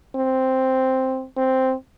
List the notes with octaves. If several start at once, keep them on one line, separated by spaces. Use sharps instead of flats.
C4
C4